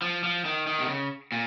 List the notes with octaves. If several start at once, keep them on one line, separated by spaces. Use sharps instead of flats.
F3
F3
D#3
D#3
C3
C#3
A#2